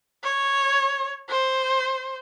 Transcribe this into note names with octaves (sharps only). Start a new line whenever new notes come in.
C#5
C5